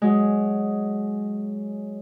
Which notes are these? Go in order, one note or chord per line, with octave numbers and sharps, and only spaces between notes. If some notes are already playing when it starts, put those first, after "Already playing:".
F#3 G#3